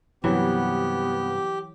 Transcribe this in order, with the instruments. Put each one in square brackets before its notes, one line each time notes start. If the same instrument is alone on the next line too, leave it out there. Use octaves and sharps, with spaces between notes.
[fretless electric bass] G2 C3 [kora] E3 F#3 [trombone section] B3 [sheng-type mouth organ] G4